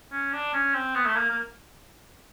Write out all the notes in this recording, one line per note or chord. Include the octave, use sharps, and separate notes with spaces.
C#4
D4
C#4
C4
B3
A3
A#3
A#3